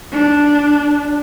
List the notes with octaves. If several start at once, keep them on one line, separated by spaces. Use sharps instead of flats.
D4